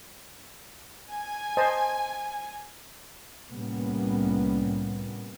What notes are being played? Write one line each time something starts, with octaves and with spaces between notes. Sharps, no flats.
G#5
C5 D#5 A5
C2 A2 G3 A#3 B3 C#4